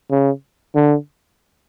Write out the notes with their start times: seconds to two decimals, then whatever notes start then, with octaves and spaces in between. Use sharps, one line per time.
0.11 C#3
0.75 D3